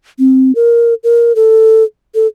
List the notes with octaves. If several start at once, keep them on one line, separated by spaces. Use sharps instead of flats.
C4
A#4
A#4
A4
A4